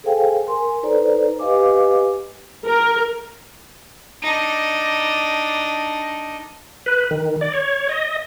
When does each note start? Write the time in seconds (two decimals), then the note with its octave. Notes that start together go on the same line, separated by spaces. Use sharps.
0.04 G#4 A4 C5 F5 G5 G#5
0.46 A#4 G#5 C6
0.83 D#4 A4 B4 C5 D5 A#5
1.39 G4 B4 D#5 F5 G#5 D6
2.66 A#4
4.23 D4 D#4
6.86 B4
7.11 D#3
7.41 D5
7.54 C#5
7.89 D#5